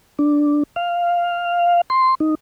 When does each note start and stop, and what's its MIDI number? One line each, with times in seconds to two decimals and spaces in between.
0.19 0.63 62
0.76 1.81 77
1.90 2.15 84
2.20 2.35 63